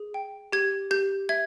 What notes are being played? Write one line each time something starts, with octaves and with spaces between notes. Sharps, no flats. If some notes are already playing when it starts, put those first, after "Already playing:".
Already playing: G#4
G5
G4 G#6
G4 G6
E5 G#6